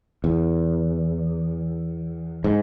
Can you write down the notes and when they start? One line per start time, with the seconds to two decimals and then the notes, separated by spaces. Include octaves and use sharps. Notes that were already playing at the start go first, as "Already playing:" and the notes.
0.24 E2
2.44 G#2